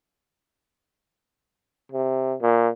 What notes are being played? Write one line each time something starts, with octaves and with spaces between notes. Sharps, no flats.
C3
A#2